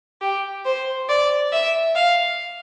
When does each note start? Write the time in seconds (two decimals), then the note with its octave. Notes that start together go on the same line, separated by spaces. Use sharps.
0.22 G4
0.65 C5
1.09 D5
1.52 E5
1.96 F5